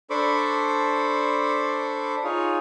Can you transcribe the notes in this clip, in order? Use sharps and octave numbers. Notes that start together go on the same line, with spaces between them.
D4 A4 C5 B5 C#6 D6
D#4 F4 G#4 C#5